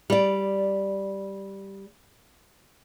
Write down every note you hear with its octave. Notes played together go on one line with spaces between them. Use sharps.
G3 D5